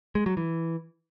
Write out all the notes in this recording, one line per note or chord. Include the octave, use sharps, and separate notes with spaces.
G#3
F#3
E3